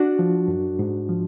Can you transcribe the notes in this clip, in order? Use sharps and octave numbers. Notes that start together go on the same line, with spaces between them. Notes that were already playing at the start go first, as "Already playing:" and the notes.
Already playing: D4 F#4
F3
F#2
G#2
F3